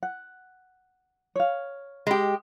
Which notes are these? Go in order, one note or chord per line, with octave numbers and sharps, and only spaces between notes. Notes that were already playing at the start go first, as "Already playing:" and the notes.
F#5
C#5 F5
G#3 G4